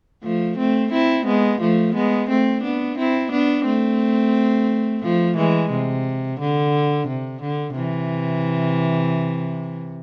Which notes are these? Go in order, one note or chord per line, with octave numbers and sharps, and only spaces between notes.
F3 A3
A3 C4
C4 E4
G#3 B3
F3 A3
G#3 B3
A3 C4
B3 D4
C4 E4
B3 D4
A3 C4
F3 A3
E3 G#3
C3
D3
C3
D3
C3 E3